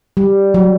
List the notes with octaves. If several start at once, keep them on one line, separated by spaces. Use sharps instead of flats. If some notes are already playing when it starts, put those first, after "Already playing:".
G3
F#3